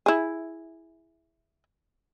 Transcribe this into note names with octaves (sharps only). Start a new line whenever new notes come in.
E4 G#4